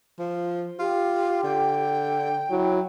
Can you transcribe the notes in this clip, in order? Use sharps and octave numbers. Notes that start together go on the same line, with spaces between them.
F3
F4 G4
D3 G5
F#3 E4